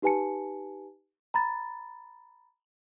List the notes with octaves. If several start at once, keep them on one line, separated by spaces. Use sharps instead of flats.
D#4 G4 B4 G#5 A5 C#7
A#5 B5 A6